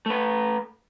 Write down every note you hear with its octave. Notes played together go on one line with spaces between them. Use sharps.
A3 B4